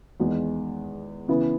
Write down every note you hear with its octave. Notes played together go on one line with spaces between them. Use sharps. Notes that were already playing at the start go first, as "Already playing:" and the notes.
E2 D#3 G#3
C#3 E3 B3